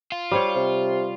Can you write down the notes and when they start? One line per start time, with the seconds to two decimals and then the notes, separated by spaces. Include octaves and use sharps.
0.12 F4
0.31 G3 C5 C#5
0.56 C3